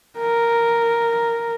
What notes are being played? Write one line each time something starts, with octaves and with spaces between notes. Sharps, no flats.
A#4